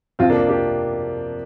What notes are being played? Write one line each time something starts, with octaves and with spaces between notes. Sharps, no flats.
F2 C3 F3 C4 F4
A#3 D4
D4 G4